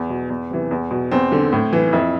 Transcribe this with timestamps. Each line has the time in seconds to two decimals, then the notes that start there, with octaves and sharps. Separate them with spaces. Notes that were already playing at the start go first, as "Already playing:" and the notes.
Already playing: E2
0.10 B2
0.30 E2
0.51 C3 E3
0.71 E2
0.91 B2
1.11 E2 C4
1.32 D3
1.52 A2
1.73 E3
1.93 F2 E4